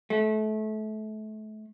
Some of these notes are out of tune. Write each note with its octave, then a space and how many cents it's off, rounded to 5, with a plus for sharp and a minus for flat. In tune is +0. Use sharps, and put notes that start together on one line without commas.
A3 -30